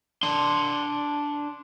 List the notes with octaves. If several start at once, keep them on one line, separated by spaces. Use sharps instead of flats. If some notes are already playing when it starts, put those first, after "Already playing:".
D4 C6